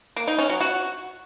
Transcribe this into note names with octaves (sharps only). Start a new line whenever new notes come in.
A#3
D#4
C#4
F#3
F#4